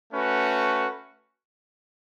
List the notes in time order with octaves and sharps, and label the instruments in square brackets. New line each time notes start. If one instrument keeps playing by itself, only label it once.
[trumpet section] A3 C#4 F#4 B4